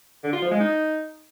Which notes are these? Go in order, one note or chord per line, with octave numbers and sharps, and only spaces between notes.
D3
F4
F3
G#3
D#4